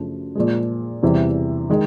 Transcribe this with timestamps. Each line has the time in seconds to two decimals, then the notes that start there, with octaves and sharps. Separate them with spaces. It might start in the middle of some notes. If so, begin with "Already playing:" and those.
Already playing: F#2 C#3 F3 A3 D4
0.35 A#2 F3 G#3
1.02 E2 C3 E3 G3
1.70 D#3 G#3